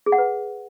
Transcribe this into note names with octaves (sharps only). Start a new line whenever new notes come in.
G#4
F#5
B4